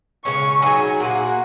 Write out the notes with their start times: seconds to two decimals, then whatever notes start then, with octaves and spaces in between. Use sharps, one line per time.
0.24 C#3 G#3 C#4 C#6
0.62 F#3 D#4 G#4 G#5
1.00 A#2 A#3 F#4 F#5